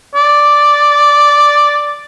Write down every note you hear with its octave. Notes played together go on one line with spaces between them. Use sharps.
D5